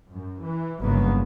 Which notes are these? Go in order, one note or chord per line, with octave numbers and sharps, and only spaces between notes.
F#2
E3
G1 E2 C#3 F#3 A#3 B3